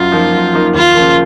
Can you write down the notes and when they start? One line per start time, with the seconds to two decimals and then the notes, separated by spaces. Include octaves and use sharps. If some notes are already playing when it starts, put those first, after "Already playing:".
Already playing: F#2 F4
0.12 F3 A#3 D#4
0.32 F#2
0.53 F3 A#3 D#4
0.74 D#2 F4
0.95 C#3 F3 A#3